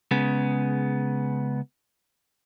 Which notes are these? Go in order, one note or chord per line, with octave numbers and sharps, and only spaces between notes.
C#3 G#3 B3